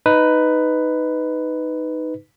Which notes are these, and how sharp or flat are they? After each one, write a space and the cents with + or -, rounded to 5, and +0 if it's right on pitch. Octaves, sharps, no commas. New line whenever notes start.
D#4 +0 B4 +10